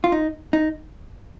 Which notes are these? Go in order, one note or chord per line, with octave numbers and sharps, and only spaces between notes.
F4
D#4
D#4